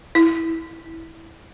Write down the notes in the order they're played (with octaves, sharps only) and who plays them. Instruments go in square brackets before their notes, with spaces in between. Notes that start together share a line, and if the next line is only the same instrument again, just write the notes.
[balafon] E4